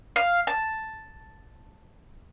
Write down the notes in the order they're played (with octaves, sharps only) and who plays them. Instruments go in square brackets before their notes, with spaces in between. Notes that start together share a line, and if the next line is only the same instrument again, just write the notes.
[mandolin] F5
A5